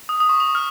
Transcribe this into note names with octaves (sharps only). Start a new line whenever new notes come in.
D#6
D#6
C#6
D#6
F6